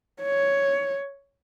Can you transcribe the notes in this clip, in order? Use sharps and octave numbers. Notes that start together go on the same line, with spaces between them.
C#5